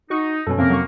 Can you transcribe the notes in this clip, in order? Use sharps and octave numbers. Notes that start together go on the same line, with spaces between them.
D#4 F#4 C#6
F#2 B2 C#4 A4
F2 C3 A#3 A#4
F#3 C#6